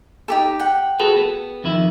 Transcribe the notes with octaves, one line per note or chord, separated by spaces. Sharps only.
D#4 G4 A4
F#5 G5
F#4 G#4 A4 B4 G7
B3
F2 D#3 E4